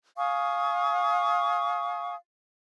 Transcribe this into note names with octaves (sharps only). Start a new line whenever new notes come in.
F5 G#5 C#6 D#6